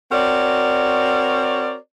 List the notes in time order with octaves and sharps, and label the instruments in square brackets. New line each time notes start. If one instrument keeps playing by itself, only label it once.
[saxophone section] C4 F#4 A#4 C#5 D5